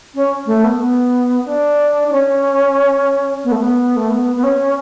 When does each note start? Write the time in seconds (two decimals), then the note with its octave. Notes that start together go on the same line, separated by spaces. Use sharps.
0.14 C#4
0.46 A3
0.63 B3
0.79 B3
1.45 D4
2.07 D4
2.12 C#4
3.44 B3
3.51 A3
3.58 B3
3.96 A3
4.09 B3
4.35 B3
4.43 C#4